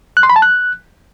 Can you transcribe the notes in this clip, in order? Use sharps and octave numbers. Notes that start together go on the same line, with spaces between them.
F#6
C6
B5
A5
F#6